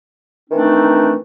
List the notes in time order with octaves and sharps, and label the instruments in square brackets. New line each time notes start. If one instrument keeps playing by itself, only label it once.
[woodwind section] D#3 E3 A3 C4 D4 D#4